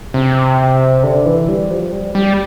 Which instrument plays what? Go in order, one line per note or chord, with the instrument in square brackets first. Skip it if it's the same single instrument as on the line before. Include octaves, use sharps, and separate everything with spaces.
[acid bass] C3
D3
E3
G3
F3
G3
G3